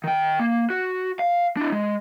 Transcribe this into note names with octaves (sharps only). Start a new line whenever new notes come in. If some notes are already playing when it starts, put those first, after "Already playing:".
D#3 G5
A#3
F#4
F5
D4 E4
G#3